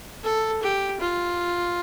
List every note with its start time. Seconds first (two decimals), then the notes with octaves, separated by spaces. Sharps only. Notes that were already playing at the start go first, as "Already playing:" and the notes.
0.24 A4
0.63 G4
1.00 F4